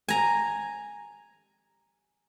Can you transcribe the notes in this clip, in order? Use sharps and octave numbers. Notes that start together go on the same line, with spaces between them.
G#5 A#5